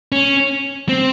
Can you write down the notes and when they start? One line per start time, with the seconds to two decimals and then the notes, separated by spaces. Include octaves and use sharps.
0.12 C#4
0.89 C4